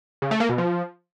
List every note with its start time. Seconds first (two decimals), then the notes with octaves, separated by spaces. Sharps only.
0.22 C#3
0.31 A3
0.40 A#3
0.49 B2
0.58 F3